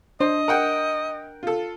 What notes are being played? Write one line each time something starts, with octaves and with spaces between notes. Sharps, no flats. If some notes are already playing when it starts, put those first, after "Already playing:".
D4 C5 D#5
A#4 F#5 G5
F4 A4